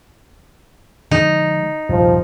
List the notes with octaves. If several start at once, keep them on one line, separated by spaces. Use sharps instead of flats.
D3 F3 G#3 D#4
D#1 G2 C3 F3